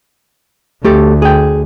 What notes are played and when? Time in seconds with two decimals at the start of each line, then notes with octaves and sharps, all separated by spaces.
0.84 D2 A3 G4 A4
1.22 G#4 G5